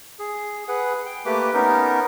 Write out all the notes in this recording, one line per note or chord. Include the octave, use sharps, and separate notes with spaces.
G#4
G#4 B4 F#5
G5
A3 A#3 G4 B4 D6
B3 C#4 D#4 A#4